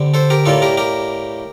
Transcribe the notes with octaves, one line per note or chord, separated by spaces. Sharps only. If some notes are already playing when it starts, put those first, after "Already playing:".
Already playing: D3 G3 C4
A4 C5
G4 A#4
A2 G3 A#3 F4 A4
G4 A#4
G4 A#4